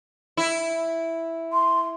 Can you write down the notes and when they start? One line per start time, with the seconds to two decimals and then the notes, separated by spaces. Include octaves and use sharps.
0.37 E4
1.53 C6